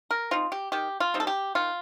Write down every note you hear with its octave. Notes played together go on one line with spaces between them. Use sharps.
A#4
C4 D#4 F4
G4
D#3 G4
F4
G3 C4 D#4
A4
G4
D#3 F4